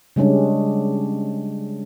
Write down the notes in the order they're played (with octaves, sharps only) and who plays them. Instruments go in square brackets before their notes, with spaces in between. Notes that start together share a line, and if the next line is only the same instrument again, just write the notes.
[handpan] C#3 G3 G#3 C#4 D4